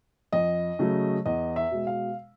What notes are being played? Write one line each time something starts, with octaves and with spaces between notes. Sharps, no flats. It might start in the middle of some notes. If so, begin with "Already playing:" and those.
F2 D#5
C#3 F#3 A3
E2 D#5
E5
B2 G#3
F5